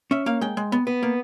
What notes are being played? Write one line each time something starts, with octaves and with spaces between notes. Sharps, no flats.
C#4 E5
A#3 F5
G#3 G5
G#3
B3
B3
A#3